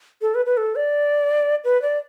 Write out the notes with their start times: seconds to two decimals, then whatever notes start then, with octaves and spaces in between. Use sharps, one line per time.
0.22 A4
0.35 B4
0.46 B4
0.57 A4
0.76 D5
1.64 B4
1.82 D5